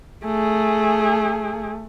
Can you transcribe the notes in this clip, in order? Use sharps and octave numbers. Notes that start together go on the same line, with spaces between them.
A3 G#4